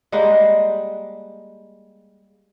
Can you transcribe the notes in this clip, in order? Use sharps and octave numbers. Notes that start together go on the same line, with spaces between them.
G3 G#3 A#3 F#5